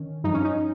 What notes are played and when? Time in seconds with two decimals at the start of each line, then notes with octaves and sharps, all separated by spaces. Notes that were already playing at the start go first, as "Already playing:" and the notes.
Already playing: D#3 C#4
0.24 G2 F3 D#4
0.34 C#4
0.44 D#4